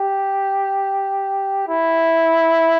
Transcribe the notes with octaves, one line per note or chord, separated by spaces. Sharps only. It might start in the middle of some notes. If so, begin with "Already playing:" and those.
Already playing: G4
E4